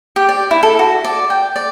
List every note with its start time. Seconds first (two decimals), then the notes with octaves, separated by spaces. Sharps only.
0.16 G4
0.29 D5
0.51 E4
0.63 A4
0.79 F#4
1.04 D5
1.30 G5
1.56 D5